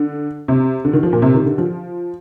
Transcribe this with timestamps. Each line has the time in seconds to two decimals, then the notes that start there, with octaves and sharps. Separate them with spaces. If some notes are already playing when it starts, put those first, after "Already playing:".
Already playing: D3
0.48 C3
0.85 D3
0.93 D#3
1.03 F3
1.13 A#2
1.22 C3
1.34 D#3
1.46 D3
1.58 F3